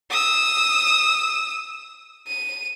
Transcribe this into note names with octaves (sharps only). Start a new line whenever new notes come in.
D#6 E6
D#7